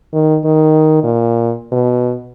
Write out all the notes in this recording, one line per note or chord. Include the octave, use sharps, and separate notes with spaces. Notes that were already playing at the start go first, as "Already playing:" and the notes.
D#3
D#3
A#2
B2